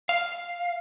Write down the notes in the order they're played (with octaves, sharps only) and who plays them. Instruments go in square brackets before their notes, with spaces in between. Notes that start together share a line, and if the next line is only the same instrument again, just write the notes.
[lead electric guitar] F5